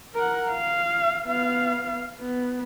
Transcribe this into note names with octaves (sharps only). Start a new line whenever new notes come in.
A#4 F#5
F5
B3 F5
B3